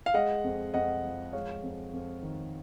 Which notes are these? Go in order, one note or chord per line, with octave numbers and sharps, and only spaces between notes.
F5
G#3 D#5 F#5
F2
F2 D#5 F#5
F3
G#3 C#5 F5
F2
F2
D#3